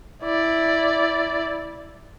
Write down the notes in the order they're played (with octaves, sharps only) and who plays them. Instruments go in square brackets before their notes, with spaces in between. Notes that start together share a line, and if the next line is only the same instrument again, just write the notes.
[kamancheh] E4 D5